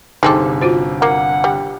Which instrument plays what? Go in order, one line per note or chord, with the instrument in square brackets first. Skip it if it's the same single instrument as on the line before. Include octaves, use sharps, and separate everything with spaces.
[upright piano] G1 C3 [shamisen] G#3 C4 A4 [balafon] D#4 D6
[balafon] F4 F#4 C5
[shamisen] A#3 [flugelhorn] F#5
[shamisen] G3